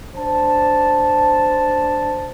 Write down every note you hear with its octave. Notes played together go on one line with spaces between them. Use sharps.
D4 C5 A5